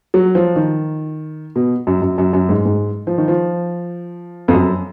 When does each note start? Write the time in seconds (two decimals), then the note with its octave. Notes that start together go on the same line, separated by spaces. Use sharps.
0.14 F#3
0.35 F3
0.56 D#3
1.56 B2
1.87 F#2
2.02 F#2
2.18 F#2
2.33 F#2
2.49 G#2
2.65 G#2
3.07 F3
3.18 D#3
3.28 F3
4.48 F2
4.53 F#2